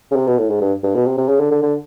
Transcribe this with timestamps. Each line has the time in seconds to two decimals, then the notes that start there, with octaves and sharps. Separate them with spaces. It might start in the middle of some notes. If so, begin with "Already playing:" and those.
0.11 C#3
0.15 C3
0.27 B2
0.38 A2
0.50 G#2
0.61 G2
0.83 G2
0.95 B2
1.06 C3
1.17 C3
1.29 C#3
1.40 D3
1.51 D3
1.63 D3